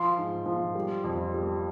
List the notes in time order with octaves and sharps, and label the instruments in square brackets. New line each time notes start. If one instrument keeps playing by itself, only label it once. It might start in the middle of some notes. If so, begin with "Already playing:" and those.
Already playing: [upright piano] F3 C6
G#2
F3
G3
F2
G3